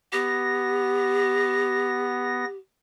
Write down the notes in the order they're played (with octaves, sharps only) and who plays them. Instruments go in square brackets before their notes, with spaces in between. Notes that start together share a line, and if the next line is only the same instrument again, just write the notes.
[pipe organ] B3 A#6 [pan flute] G4